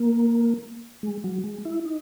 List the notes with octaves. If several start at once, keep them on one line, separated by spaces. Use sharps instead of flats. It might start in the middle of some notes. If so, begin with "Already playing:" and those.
Already playing: A#3
G#3
F#3
G#3
E4
D#4